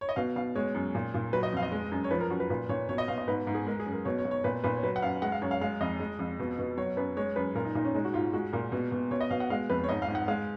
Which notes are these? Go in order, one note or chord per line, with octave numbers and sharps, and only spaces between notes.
C#5
D#5
B2 F5
B2 F5
G#3 C#5
F#2
A#2
A#2
F#3 B4
D#5
F2 F5
D#5
G#3
F#2
C#5
F3 B4
A#4
F#2 F#4
B4
A#2 B4
A#2 C#5
B2 C#5
D#5
B2 F5
D#5
G#2 B4
G#2
G#4
G#3 A#4
G#4
F#2
A#4
B2 C#5
C#5
B2
C#5
A#2 B4
A#2 B4
C#5
F#3 B4
F#5
F#2 F5
G#3 F#5
F5
F#2 C#5
F5
G#3 F5
F2 D#5
G#3
F2
B2
B2
F#3 C#5
F#2 B4
G#3 C#5
F#2 B4
A#2 A#4
D#4
A#2 D#4
C#4
G#3 D#4
F#4
G#2 F4
G#3 F#4
A#2 A#4
B2
B2
B2 C#5
D#5
B2 F5
F#5
G#3 F5
F2 B4
C#5
G#2 D#5
F5
G#2
F#5
G#3 F5